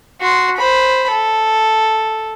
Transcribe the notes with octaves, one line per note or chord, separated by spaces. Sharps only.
F#4 C6
C5 B5
A4